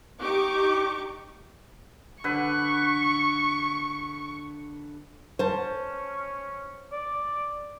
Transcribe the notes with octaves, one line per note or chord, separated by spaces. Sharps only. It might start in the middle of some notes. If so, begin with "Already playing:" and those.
D#4 G4 C#6 D6
D3 B4 C#6
C#4 C5 A5
D5